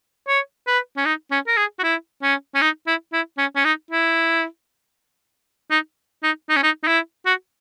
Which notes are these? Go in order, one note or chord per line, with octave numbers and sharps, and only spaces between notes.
C#5
B4
C#4
D#4
C#4
A#4
G#4
F#4
E4
C#4
C#4
D#4
E4
E4
C#4
C#4
D#4
E4
D#4
D#4
D#4
C#4
D#4
D#4
E4
F#4